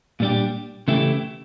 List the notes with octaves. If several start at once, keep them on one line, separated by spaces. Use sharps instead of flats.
A#2 G3 D4 G4
C#3 E3 A3 E4 G4